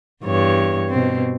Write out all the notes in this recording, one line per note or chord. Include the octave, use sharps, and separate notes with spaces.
E2 G2 C#5
B2 C4